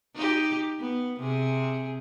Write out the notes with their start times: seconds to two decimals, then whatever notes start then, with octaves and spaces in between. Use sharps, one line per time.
0.15 D#4 G4
0.80 B3
1.20 C3 G#4